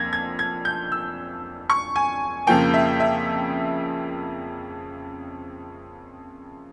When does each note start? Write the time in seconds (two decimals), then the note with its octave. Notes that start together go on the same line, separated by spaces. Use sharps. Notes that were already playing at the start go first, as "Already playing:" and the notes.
Already playing: F2 F3 A#3 G#6 A#6
0.13 G#6
0.39 G#6
0.65 G6
0.92 E6
1.70 C#6
1.96 G#5
2.47 F2 C#3 F3 A#3 G5
2.74 E5
3.00 E5